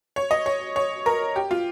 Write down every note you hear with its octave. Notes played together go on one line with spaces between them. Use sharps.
C#5
D#5
C#5
C#5
A#4
G4
F4